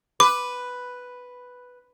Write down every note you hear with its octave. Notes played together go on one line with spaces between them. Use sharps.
B4 D6